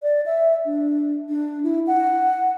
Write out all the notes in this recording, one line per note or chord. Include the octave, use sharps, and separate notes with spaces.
D5
E5
D4
D4
E4
F#5